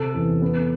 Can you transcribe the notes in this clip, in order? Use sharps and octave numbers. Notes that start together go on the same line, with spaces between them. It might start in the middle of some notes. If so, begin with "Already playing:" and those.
Already playing: C3 A4
E2
B3 A4